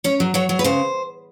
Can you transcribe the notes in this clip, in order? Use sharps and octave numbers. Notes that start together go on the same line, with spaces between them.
C#4 C#5
F#3
F#3 C#5
F#3
B4
C#3 C5